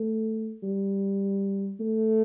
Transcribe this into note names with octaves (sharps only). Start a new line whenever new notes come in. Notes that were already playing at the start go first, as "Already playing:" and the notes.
Already playing: A3
G3
A3